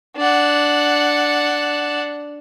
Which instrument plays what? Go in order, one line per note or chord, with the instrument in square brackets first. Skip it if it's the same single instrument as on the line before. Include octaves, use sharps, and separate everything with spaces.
[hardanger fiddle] D4 F#5